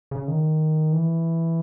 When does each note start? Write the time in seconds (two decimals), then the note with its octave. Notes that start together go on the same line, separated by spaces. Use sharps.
0.11 C#3
0.28 D#3
0.92 E3